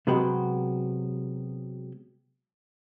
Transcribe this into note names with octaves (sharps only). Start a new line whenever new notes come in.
C3 F#3 G#3 B3 F#4 G4